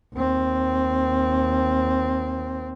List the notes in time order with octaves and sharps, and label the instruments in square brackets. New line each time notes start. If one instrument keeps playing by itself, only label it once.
[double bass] D#2 C4